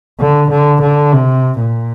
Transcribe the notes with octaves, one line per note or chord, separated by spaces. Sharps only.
D3
D3
D3
C3
A#2